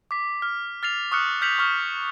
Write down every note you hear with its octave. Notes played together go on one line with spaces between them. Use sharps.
D6 B6
F6
F6 A6 C7 F7
C#6 D#6 F6 F#6 C#7
F6 G6 B6 C#7 F7 F#7
C#6 F6